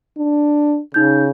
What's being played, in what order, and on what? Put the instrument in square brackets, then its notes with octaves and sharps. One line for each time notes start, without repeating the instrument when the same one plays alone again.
[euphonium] D4
[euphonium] C#3 [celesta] D#4 G6